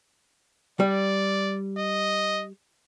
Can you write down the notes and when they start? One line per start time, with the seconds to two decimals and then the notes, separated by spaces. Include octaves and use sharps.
0.80 G3 D5
1.78 D#5